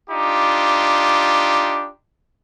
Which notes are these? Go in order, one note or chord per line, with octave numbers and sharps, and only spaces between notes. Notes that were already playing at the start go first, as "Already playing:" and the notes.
D4 D#4 F4 G4